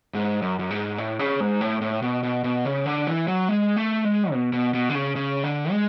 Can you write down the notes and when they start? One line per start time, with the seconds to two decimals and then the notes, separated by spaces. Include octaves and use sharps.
0.14 G#2
0.42 F#2
0.59 F#2
0.70 G#2
0.98 A2
1.19 C#3
1.40 G#2
1.61 A2
1.82 A2
2.02 B2
2.23 B2
2.44 B2
2.65 C#3
2.86 D3
3.07 E3
3.28 F#3
3.49 G#3
3.76 A3
4.04 G#3
4.32 B2
4.53 B2
4.74 B2
4.89 D3
4.95 C#3
5.16 C#3
5.44 D3
5.71 G#3